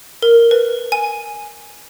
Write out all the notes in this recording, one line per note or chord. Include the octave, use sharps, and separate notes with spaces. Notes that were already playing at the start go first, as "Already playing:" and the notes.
A#4
B4
G#5